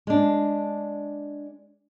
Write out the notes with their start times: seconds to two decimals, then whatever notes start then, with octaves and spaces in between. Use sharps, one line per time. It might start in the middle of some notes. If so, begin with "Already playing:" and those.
0.07 G#3 D4